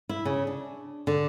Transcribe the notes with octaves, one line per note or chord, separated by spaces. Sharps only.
E4
C#3
D4
D3